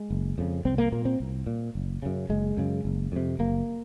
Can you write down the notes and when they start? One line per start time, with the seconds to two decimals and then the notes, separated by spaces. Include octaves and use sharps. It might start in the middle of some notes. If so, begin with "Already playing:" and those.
Already playing: G#3
0.10 F#1
0.38 F2 C#3
0.65 C2 C4
0.78 A#3
0.92 A#2 A#3
1.05 C4
1.20 C2
1.47 A#2
1.75 F#1
2.02 F#2 C#3
2.29 F#1 G#3
2.57 F#2 C#3
2.85 F#1
3.12 F2 C3
3.39 F#1 A#3